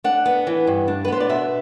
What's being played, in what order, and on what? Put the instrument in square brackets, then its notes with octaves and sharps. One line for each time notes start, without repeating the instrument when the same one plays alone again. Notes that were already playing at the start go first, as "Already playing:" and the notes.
[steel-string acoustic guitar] D4 F#5
B3
E3
G2
D4
B4
B3 C5
D5
B2 E5